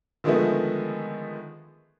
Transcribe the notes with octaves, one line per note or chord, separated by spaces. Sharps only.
D3 D#3 F3 G#3 A3 B3